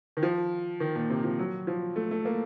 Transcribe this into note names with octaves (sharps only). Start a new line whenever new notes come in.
D#3
F3
D#3
A#2
C3
F3
F#3
F3
A3
A3
A#3